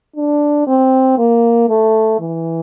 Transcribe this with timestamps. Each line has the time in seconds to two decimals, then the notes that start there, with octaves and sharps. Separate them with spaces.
0.16 D4
0.67 C4
1.18 A#3
1.69 A3
2.20 E3